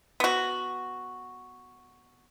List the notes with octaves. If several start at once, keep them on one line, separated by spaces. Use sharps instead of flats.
B3 F#4